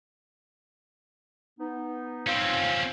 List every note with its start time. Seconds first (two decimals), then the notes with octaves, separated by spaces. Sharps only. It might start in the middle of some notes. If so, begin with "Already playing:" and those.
1.59 B3 D#4
2.27 C4 C#4 F4